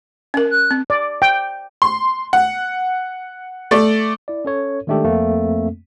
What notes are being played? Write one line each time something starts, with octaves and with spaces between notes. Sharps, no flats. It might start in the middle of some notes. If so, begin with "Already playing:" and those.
C#4 A#4
F#6
C4
D5
G5
C6
F#5
A3 D5
E4 D5
C#4 A4 C#5
D#3 G#3 A3 D4 G4 A4
F2 A3 A#3 C4